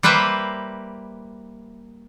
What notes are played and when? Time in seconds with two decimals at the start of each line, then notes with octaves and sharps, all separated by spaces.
0.03 G3 A#3 B4 C5 E5